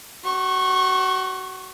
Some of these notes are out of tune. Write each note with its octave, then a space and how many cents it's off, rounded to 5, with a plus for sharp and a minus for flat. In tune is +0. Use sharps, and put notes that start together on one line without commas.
F#4 +30 C#6 -25